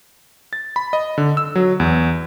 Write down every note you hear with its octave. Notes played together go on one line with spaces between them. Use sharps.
A6
B5
D#5
D3
E6
F#3
E2